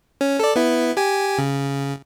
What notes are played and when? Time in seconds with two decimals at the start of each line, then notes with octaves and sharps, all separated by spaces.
0.21 C#4
0.40 A4 D5
0.56 B3 E4
0.97 G4 G#5
1.38 C#3